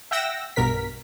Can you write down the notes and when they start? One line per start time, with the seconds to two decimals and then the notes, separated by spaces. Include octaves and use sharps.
0.11 E5 F#5 G5 E6 A#6
0.56 B1 G2 B2 A#4 B6